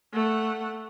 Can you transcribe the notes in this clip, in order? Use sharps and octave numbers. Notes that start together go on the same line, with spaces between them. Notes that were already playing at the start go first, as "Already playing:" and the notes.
A3 F#5